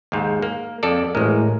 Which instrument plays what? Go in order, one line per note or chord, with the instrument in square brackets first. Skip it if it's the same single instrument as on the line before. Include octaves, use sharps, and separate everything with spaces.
[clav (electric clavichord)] D#2 G#2
A#3
F2 A4 D5
[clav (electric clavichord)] A1 G#3 [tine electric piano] A2 A#4